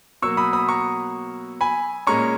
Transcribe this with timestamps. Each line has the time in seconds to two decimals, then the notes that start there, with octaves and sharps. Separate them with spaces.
0.22 B2 F#3 A#3 C#6 E6
0.37 B5 D#6
0.53 B5 D#6
0.69 A#5 C#6
1.61 G#5 B5
2.07 A#2 G#3 C#4 A#5 C#6